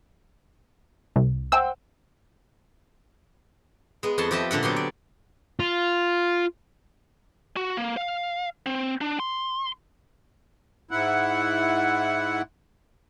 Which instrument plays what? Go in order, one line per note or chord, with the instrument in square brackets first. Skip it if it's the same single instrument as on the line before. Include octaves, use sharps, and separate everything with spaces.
[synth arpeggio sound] C2
[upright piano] C5 F#5 G5 [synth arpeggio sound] E6
[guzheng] G#3 B3
F2 B3 F#5 A5 C6
F3 G4 D#5 E5 A5
A#2 D3 A4 F#5
F#3 B3 G4 C6
D5
[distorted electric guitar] F4
[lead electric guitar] F#4
A#3
F5
C4
D4
C6
[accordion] G#2 E4 F#5